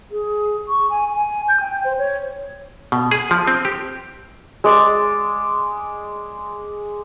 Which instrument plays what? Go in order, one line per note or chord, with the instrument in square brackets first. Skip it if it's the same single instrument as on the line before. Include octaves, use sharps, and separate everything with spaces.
[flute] G#4
C#6
G#5
G#5
G6
G5
C5
C#5
[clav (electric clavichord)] B2
G#4
F3
C4
G4
[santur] G#3 D5